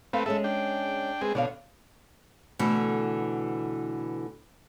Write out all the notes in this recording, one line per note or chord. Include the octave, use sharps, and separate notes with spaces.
A3 C4 B4 F5
G#3 C#4 G#4 A4 E5
D4 G5
G#3 C4 G#4 B4
B2 D3 D4 C#5 F5
B2 D3 E3 A3